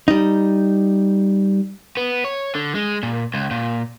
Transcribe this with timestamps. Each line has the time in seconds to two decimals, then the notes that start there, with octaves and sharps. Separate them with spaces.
0.08 G3 D#4
1.97 B3
2.24 C#5
2.55 D3
2.75 G#3
3.03 A#2
3.34 C#2
3.51 A#2